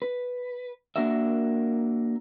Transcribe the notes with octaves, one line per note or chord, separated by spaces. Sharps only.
B4
A#3 D4 F#4 A#4 E5